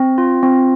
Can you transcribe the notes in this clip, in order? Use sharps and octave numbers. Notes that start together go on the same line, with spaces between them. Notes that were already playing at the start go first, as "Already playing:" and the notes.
Already playing: C4
F4
C4